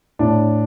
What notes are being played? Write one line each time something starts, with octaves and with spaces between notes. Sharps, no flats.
A2 D4